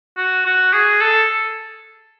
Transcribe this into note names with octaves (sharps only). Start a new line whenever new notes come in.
F#4
F#4
G#4
A4